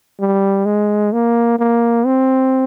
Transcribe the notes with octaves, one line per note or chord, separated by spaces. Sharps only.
G3
G#3
A#3
A#3
C4